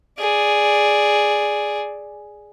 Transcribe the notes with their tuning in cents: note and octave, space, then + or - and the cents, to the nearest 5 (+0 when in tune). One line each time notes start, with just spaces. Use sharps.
G#4 +0 D5 +0